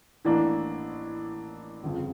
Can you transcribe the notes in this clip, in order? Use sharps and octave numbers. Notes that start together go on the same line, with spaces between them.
A1 A2 E3 A#3 D4
G1 F2 C#3